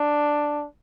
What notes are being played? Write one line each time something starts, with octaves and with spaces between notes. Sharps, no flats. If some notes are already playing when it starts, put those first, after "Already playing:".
Already playing: D4